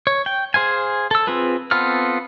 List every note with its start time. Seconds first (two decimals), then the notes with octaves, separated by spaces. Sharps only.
0.07 C#5
0.26 G5
0.54 G#4 C5 F5 G#5
1.11 A4 E6
1.27 C4 F4 G#4 B4
1.71 B3 C4 F4 A4 F6